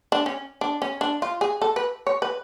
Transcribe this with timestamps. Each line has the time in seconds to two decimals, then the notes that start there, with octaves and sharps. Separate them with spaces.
0.12 D4
0.26 C#4
0.61 D4
0.82 C#4
1.01 D4
1.22 F4
1.41 G#4
1.62 A4
1.76 B4
2.07 C#5
2.22 B4